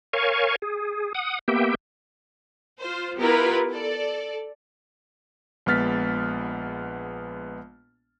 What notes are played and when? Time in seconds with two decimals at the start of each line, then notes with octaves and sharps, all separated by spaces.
0.13 A#4 C#5 F5 G#5 C#6
0.62 G#4
1.15 F#5 D#6
1.48 A#3 B3 G4 E5 G5
2.79 F4 C5
3.20 B3 E4 F4 G4 A#4 B4
3.72 A4 D5
5.66 A#1 G#3 B3 F6 A6 B6